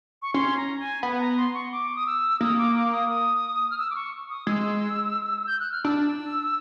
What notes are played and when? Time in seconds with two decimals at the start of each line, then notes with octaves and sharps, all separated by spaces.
0.22 C#6
0.34 C#4 C6
0.57 A#5
0.80 G#5
1.03 B3
1.20 A#5
1.37 C6
1.54 C#6
1.72 D6
1.96 D#6
2.07 E6
2.41 A#3 D#6
2.58 D6
2.75 D6
2.92 D#6
3.09 D#6
3.71 F6
3.78 E6
3.90 D6
3.95 C#6
4.30 D#6
4.47 G#3 E6
5.47 G6
5.60 F#6
5.72 F6
5.85 D4 E6